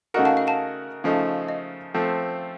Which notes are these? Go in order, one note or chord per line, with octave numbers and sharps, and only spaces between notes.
C#3 A3 D#4 F#4 A#4 F#5
F5 A5
F5
F5 A5
C#3 F3 A3 D#4
D#5
F3 A3 C4